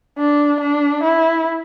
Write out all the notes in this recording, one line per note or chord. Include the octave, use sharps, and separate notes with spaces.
D4
D4
E4